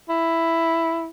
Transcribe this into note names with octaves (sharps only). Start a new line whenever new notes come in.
E4